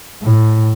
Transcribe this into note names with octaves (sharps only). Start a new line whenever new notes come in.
A2